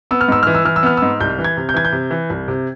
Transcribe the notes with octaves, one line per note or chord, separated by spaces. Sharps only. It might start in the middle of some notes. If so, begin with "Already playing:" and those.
B3 E6
F6
G#2 E6
E3 F6
E6
E3 F6
E6
B3 F6
G#2 E6
C2 G6
E3
G#6
C3
G6
E3 G#6
G6
C3
E3
C2
C3